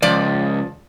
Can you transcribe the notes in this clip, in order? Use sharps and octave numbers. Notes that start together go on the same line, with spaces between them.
C#2 F3 D5